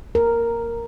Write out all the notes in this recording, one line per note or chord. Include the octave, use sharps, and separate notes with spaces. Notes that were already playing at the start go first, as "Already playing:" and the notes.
A#4